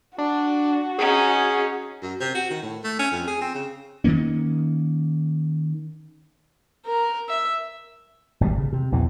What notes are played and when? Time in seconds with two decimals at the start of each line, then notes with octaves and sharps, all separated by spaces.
0.18 D4 F#4
0.98 C#4 D#4 G#4
2.02 F#2
2.20 C3
2.35 F#4
2.50 D#3
2.62 A2
2.84 A3
2.99 C#4
3.12 F2
3.28 G#4
3.41 C4
3.55 C#3
4.04 D#3 F3 A#3 C#4
6.86 A#4
7.29 E5
8.41 G#1 B2 D3 G3
8.58 C#3
8.73 C3
8.92 A#1 E2 E3